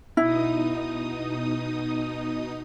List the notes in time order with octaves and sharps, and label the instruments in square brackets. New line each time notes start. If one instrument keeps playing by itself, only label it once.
[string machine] B2 D#4 D#6 [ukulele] E4